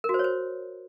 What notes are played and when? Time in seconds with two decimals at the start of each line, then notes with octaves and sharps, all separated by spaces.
0.04 A#4
0.09 F#4
0.14 C5
0.19 C#5
0.24 C5